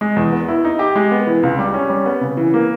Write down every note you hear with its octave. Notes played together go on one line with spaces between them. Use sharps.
G#3
E2
B3
E4
D#4
G4
G#3
B3
E3
C#2
G3
C#4
G3
B3
C#3
E3
A#3